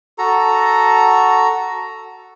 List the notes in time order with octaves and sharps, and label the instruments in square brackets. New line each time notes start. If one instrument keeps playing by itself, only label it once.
[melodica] F#4 A4 A#5